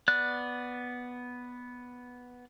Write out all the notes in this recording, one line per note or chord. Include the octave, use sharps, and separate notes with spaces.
B3 D5 F#6